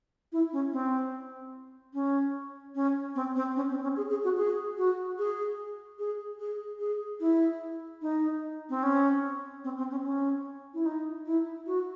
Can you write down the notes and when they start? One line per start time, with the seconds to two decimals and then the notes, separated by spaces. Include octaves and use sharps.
0.32 E4
0.53 C#4
0.72 C4
1.94 C#4
2.75 C#4
3.15 C4
3.36 C4
3.56 C#4
3.70 C4
3.83 C#4
3.97 G#4
4.10 G#4
4.24 F#4
4.37 G#4
4.78 F#4
5.18 G#4
5.99 G#4
6.40 G#4
6.80 G#4
7.20 E4
8.02 D#4
8.70 C4
8.83 C#4
9.64 C4
9.78 C4
9.91 C#4
10.04 C#4
10.74 E4
10.86 D#4
11.26 E4
11.67 F#4